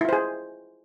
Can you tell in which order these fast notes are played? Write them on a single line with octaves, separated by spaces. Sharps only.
E4 F4 C5 G#4